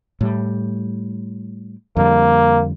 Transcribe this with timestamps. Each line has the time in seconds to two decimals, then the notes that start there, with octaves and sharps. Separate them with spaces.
0.21 A2 G3
1.97 F2 D3 G3 A#3